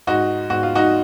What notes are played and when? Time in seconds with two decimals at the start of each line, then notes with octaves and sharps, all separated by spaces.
0.07 G#2 D#4 F#4
0.50 G#2 F#4
0.63 F4
0.75 D#4 F#4